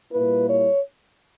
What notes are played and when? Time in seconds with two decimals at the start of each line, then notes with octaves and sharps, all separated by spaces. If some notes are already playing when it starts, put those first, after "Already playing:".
0.11 A#2 G3 A#3 E4 B4
0.47 C#5